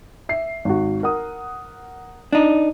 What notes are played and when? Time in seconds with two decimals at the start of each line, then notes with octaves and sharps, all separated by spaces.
0.29 E5 C7
0.65 G#1 F#4
1.03 A#4 F#5 D#6
2.32 D4 D#4